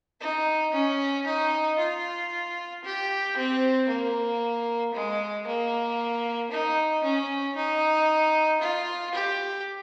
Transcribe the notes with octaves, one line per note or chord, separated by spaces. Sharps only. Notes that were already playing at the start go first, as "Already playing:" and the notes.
D#4
C#4
D#4
F4
G4
C4
A#3
G#3
A#3
D#4
C#4
D#4
F4
G4